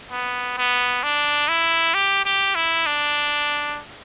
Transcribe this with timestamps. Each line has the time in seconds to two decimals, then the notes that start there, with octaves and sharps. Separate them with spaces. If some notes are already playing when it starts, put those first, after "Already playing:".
0.11 B3
0.58 B3
1.03 D4
1.48 E4
1.94 G4
2.25 G4
2.55 E4
2.86 D4